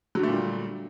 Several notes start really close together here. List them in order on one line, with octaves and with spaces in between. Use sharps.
F#3 D3 A3 A#2 G3